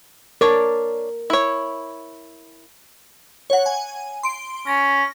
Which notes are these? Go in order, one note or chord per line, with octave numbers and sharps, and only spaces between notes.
D4 A#4 C#5 D5
E4 C#5
C#5 F#5
G#5
C6 D7
C#4 A#6